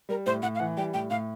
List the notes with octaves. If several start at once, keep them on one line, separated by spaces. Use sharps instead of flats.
G3 A#4
A2 C5
A2 F#5
F5
E3 F#5
G3 G5
A2 G5
A2 F5